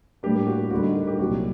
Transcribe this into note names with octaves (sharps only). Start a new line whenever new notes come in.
A2 G3 A#3 D4 G4
F#4
D2 D3 G3 F#4
D#4
A#4
G4
C2 A#2 F#3 F#4